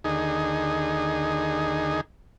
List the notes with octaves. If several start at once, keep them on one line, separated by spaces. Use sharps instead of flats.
D#2 D3 D#4 G#4